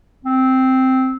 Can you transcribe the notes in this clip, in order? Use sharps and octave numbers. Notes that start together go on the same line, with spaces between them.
C4